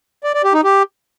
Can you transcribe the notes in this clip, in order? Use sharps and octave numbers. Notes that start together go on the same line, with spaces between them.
D5
D5
G4
D#4
G4